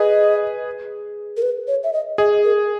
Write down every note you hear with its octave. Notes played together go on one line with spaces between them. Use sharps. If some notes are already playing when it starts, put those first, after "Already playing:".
Already playing: G#4 B4 D#5
A#4
B4
C#5
E5
D#5
G#4 D#5
A#4